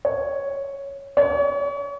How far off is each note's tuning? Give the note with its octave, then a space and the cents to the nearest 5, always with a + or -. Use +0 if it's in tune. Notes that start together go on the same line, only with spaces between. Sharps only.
C#5 +0
C#5 +35